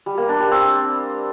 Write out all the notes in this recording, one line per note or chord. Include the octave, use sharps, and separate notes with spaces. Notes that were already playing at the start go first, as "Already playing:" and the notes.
G3
A#3
D4
G3
C4